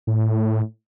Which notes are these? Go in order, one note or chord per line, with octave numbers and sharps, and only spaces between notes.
A2